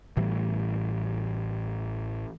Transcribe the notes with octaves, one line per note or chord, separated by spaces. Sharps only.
A1 A2 E3 G3